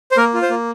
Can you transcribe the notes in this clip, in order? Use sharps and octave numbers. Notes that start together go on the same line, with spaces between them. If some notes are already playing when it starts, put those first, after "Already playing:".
C5
A#3 A#4
F4
C5
A#3